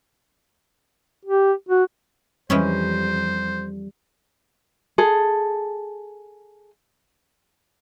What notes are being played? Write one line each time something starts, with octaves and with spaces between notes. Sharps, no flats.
G4
F#4
F2 E3 G3 G#3 C#4 C5
G#4 A4